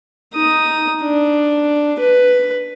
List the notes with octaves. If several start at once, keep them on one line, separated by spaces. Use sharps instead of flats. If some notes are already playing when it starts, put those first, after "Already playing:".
D#4 D#6
D4
B4